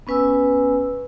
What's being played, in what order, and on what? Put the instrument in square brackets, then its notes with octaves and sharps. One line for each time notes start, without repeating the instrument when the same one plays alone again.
[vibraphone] B3 C#4 B4 G#5 E6